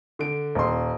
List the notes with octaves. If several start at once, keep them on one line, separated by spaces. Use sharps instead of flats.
D3 D7
D#1 C6